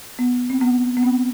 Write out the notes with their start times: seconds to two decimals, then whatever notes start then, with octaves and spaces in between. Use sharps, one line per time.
0.19 B3
0.50 C4
0.61 B3
0.97 B3
1.03 C4